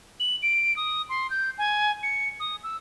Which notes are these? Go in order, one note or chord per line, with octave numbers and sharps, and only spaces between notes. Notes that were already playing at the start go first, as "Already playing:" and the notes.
F#7
D7
D#6
C6
G6
G#5
C#7
D#6
E6